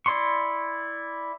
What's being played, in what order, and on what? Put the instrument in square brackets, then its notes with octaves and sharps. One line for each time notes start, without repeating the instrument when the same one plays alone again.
[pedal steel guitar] E4 D5 C6 C#6